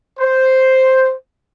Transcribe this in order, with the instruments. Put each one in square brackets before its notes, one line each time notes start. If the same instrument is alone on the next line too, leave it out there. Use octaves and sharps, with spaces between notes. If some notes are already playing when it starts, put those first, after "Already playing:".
[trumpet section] C5